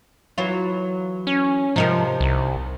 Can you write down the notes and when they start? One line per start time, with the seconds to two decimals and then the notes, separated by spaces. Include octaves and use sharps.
0.38 E3 F#3 F4
1.27 C#4
1.76 C3 F3 D#4 A#4
2.21 C2